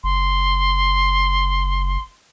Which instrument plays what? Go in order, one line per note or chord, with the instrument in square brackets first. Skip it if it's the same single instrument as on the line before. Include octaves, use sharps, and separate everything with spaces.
[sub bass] F#1 [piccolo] C6